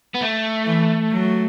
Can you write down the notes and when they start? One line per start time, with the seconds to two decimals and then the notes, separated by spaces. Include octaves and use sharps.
0.14 B3
0.22 A3
0.66 E3
1.12 F#3